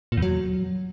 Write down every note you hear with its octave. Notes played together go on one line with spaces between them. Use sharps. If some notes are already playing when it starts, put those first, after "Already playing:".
A#2
E2
F#3